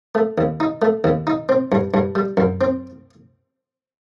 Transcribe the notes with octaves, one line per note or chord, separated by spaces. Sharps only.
A3
D#2
D#4
A3
D#2
D#4
C4
G2
G2
G3
F#2
C4